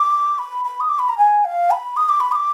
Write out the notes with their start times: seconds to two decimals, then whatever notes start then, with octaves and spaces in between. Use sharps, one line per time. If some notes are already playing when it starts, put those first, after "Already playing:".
Already playing: D6
0.39 B5
0.65 B5
0.80 D#6
0.89 D6
0.99 B5
1.09 A#5
1.18 G#5
1.45 F5
1.71 B5
1.97 D#6
2.09 D6
2.20 B5
2.32 D#6
2.35 D6